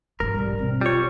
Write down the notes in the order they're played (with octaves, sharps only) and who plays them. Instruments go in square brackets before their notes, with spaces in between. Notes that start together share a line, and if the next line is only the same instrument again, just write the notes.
[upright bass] G2 F3 [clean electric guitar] A#4
[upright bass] A#1 G#2 [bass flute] G3
[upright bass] B2 F#3 [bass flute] C4
[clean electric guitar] G3 C#5 [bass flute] F4